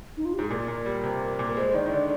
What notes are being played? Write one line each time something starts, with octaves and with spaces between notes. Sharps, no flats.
D#4
F4
G4
G#2 G#4
A#2 A#4
A#2
G3
C3
A#2
A#4
G#3 C5
D#3 D5
D#3
D3 D5